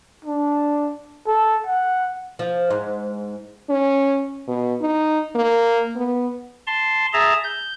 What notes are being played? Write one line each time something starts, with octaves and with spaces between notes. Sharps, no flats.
D4
A4
F#5
F3
G#2
C#4
B2
D#4
A#3
B3
A5 C6
G#4 E5 A5 A#5
G6